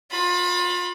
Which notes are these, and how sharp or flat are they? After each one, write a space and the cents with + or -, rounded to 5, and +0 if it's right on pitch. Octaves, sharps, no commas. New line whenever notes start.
F4 +30 B5 +0